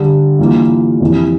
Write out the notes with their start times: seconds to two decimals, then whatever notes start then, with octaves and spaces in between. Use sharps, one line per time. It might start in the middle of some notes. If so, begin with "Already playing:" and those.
Already playing: D3 G3 D4
0.39 G2 E3 A#3 F4
1.00 F2 C3 E3